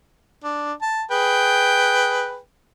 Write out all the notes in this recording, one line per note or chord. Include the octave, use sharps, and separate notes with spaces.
D4
A5
G#4 B4 G5